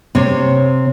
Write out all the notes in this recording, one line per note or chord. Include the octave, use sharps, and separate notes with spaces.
C3 C4 C#5